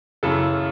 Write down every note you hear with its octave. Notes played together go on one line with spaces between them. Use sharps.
F#2 C#3 E3 A4